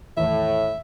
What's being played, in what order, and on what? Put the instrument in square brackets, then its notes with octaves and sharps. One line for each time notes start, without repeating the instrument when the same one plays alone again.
[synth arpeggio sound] E2 D#3 E3 [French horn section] A2 [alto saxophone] E5